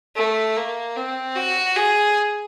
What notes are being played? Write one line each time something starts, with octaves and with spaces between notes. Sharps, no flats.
A3
A#3
C4
F#4
G#4